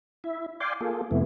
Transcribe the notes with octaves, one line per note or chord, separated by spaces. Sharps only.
E4 E5
D5 F5 G5 G#5 C6 D6
A#3 F4 G#4 A4
F2 C3 A3 B3 E4